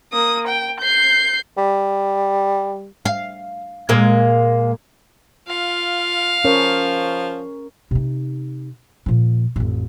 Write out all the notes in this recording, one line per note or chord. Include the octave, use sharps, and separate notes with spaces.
A#3 D#6
G5
G6 C7
G3
F5
A#2 G#3 A#3
F4 F5
F3 C#4 A#4 C#5
C3 D#4
A#2 F3
A1 F2